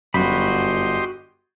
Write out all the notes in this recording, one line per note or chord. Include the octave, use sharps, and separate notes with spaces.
G1 F#2 F#4 G4 D#5 B5 C6